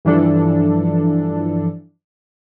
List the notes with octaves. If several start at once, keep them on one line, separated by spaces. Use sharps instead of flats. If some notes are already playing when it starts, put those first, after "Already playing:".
G2 E3 F3 D4 A4